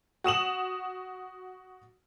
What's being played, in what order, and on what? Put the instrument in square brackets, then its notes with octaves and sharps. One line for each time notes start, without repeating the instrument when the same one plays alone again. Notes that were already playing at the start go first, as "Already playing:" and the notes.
[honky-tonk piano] F#4 D#6 E7 F#7